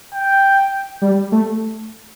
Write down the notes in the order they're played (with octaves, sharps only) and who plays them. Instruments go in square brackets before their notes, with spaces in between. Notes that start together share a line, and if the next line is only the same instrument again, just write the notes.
[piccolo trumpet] G5
[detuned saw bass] G3
A3